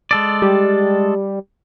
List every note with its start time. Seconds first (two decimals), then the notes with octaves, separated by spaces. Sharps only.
0.11 G#3 A4 D5
0.42 G3